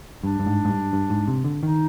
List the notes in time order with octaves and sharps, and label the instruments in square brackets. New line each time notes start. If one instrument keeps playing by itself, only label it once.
[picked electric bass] G2 [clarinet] D4
[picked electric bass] G2
G#2
G#2
G2
G2
G#2
C3
D3
[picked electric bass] D#3 [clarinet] D#4